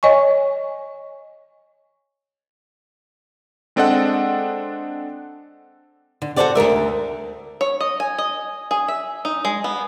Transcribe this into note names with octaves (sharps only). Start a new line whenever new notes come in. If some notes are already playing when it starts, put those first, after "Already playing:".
C#5 D#5 G#5 C#6
G#3 C4 D4 A4 D#5 F#5
D3
F#4 A4 B4 C5 D5 F#5
D2 A#2 A#4 E5
C#5
D#5
G#5
D#5
G#4
E5
D#4
G#3
B3